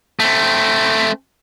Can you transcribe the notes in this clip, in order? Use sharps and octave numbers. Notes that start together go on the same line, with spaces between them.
A3 C4